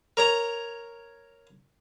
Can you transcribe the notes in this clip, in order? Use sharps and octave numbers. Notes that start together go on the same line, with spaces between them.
A#4 C#5 A#5